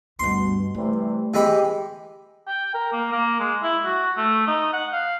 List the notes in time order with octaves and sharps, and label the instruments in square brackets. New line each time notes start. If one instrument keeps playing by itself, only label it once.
[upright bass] D2 G2 [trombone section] B2 [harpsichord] C6
[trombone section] C3 E3 G3 [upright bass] A3
[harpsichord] E3 G#3 B5 [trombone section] G4
[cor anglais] G5
A#4
A#3
A#3
G#3
E4
F#4
A3
D#4
F#5
F5